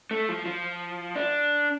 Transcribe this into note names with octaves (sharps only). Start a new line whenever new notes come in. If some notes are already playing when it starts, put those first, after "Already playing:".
A3
F3
F3
D4